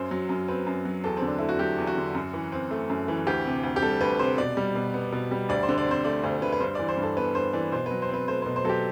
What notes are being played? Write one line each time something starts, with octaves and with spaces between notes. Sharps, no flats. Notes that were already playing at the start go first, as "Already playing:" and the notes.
Already playing: F#2 C5
F#3
F#2
C4 B4
F#2
F#3
E2 A4
C4
D3
D4
A3 E4
F#4
F#3 G4
E2
F#4
D3
F#2
E3
C4
A3
F#2
E3
D2 G4
C3
D2
G4
G3 A4
D2 B4
C3 C5
B2 D5
G3
B2
B3
B2
G3
D2 D5
C5
D3
D5
C4 C5
A3 D5
D2 C5
D3 B4
B4
G2 C5
E3 D5
C5
G2
A4
B3 B4
G2 C5
E3 D5
B2 C5
B4
F#3
C5
C4 B4
A3 C5
B2 C5
C5
F#3 G4 A4